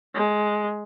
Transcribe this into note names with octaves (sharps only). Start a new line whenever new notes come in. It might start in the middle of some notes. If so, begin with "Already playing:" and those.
G#3